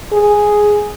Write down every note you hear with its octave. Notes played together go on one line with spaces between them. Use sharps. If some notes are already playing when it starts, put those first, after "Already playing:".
G#4